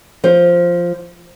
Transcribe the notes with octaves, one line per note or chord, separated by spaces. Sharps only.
F3 C5